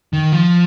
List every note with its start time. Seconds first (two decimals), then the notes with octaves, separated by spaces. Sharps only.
0.13 D#3
0.32 F3